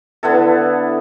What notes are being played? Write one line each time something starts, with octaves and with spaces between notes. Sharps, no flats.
D3 B3 E4 A4